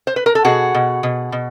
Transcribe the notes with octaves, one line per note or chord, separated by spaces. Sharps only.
C5
B4
A#4
A4
B2 F#4 G#4
B2
B2
B2